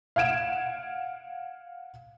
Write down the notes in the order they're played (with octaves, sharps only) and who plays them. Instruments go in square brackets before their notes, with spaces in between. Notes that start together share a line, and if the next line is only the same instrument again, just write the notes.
[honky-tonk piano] F5 F#5 G#6 D7 E7